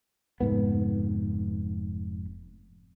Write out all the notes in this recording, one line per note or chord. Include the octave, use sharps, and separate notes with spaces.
F1 G#2 B3